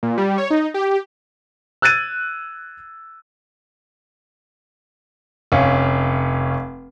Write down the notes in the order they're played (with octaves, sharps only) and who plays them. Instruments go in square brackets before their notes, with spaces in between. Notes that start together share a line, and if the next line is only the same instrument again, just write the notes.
[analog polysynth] A#2
G3
C#5
D#4
G4
[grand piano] E6 F#6 G#6 A6 D#7
F1 C#4 F5